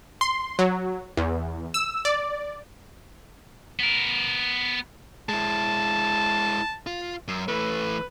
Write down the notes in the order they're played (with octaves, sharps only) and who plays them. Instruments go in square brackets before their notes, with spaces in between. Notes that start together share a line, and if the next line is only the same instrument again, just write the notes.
[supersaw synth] C6
F#3
E2
E6
D5
[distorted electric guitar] B3 A#4
[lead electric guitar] G#3 E4 [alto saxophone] A5
[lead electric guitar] F4
F#2
[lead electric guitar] E3 A3 [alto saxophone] B4